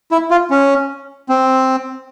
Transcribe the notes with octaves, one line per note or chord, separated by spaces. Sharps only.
E4
F4
C#4
C4